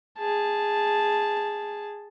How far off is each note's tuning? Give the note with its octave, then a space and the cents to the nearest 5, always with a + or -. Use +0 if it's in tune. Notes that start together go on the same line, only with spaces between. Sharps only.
G#4 -10 A5 -5